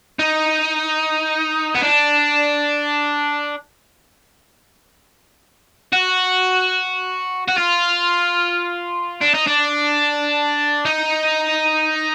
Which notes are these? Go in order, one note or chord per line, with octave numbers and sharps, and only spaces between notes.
D#4
B3
D4
F#4
F#4
F4
D4
D#4
D4
D#4